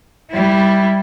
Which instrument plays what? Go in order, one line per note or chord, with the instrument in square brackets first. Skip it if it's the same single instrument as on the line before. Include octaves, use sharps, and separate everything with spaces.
[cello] G3 E4